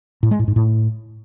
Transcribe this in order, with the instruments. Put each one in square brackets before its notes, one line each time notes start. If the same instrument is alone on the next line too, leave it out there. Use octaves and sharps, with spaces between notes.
[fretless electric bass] A2
G#3
A2
G#2
A2